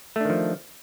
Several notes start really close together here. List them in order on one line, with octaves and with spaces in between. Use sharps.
A3 D4 D#3 F3